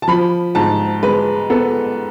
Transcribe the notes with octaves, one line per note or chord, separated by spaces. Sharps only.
A5
F3 B5
G#2 A5
G#3 B4
B3 A4